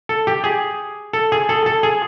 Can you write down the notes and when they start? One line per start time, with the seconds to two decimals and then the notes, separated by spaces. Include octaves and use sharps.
0.09 A4
0.27 G4
0.44 G#4
1.13 A4
1.32 G#4
1.49 A4
1.66 A4
1.83 G#4